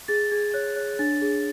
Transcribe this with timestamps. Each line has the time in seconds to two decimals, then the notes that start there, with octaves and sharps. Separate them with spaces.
0.08 G#4 A6
0.31 G#4 G#6
0.54 C#5 F#6
0.76 C#5 F#6
0.99 D4 A6
1.22 G#4